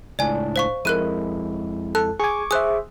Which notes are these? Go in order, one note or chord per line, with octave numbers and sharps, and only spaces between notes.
C#2 A2 D4 D5 G#5
C5 F5 C#6
F2 G#3 E4 A#4 F#6 D#7
A4 F#6
G#4 G#5 C#6 D6
G#4 C5 E5 D#6 F#6